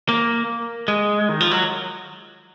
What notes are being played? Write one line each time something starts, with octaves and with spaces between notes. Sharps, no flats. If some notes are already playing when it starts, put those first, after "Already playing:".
A#3
G#3
D#3
F3
F#3